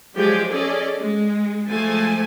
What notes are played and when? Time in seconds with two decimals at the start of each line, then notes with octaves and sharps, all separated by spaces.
0.15 F3 F#3 G#3 G4 G#4 D5
0.51 C#4 G#4 A4 D5 D#5
0.99 G#3
1.67 F3 G#3 A3 G#5 A5